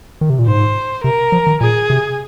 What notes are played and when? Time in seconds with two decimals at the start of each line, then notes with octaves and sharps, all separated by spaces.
0.21 D#3
0.30 C3
0.39 A#2
0.48 G#2 C5
1.04 C3 A#4
1.32 F3
1.47 D#3
1.61 A#2 G#4
1.90 C3